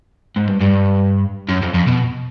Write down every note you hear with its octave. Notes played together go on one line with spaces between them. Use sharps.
G#2
G2
G2
F#2
F2
F2
B2